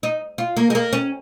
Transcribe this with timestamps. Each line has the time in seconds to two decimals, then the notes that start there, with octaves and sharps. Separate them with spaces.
0.03 D#4
0.38 F4
0.57 A#3
0.70 G#3
0.75 A#3
0.93 C#4